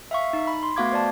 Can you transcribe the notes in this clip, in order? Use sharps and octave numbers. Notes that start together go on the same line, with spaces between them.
E5 F5 C#6
D#4
B5
C6
A3 B3 F#4 F5 D6 G#6
C5 D5 A5